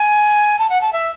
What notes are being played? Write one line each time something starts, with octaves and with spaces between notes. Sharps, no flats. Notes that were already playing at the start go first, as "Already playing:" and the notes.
Already playing: G#5
A5
F#5
A5
E5